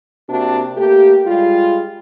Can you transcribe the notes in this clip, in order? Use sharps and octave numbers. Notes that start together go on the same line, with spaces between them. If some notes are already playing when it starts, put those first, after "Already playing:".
C3 A#3 D4 F#4
A3 A#3 G4
G3 G#3 F4